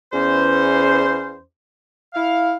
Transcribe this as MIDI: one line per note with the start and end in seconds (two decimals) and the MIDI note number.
0.13 1.40 40
0.13 1.40 61
0.13 1.40 72
2.14 2.55 64
2.14 2.55 77